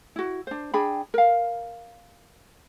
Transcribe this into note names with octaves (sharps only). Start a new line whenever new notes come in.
E4 F#4
D4 C5
D4 G#4 G5 B5
A#4 F5